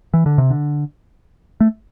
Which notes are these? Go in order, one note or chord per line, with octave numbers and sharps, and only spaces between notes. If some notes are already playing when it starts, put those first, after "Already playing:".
E3
D3
C3
D3
A3